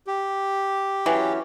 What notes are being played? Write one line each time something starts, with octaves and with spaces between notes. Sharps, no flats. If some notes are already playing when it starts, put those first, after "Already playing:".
G4
E3 F#3 C#4